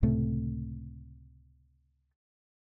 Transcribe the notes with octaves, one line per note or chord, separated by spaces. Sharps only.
C#2 A2 C3 A3